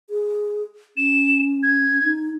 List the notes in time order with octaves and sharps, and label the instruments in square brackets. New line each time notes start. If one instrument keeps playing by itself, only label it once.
[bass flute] G#4
[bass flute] C#4 [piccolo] E7
[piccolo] G#6
[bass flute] D#4